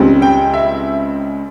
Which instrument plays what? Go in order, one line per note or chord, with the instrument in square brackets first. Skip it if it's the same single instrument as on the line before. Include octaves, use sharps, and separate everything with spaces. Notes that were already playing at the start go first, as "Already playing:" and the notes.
Already playing: [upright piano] C#2 C#3 G3 C4
G5
E5